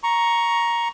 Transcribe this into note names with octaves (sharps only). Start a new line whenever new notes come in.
A#5 C#6